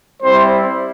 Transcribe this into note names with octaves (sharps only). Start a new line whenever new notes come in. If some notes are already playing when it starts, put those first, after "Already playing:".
G3 C4 E4 C5